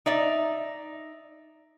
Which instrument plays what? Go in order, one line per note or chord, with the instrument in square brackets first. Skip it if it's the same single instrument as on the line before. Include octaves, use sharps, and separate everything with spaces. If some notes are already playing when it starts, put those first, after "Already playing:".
[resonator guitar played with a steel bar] D#4 D5 E5